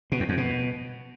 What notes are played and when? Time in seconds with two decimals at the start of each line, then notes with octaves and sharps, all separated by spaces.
0.12 B2
0.20 E2
0.29 F2
0.37 B2